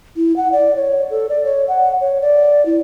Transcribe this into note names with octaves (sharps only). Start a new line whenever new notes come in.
E4
F#5
D5
C#5
A4
D5
C#5
F#5
C#5
D5
E4